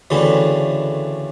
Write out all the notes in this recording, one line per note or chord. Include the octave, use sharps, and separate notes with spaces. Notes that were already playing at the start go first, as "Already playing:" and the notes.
D2 C#3 E3 A3 C4